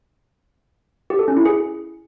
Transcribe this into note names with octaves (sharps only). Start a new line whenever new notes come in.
G4
A4
C#4
E4
G#4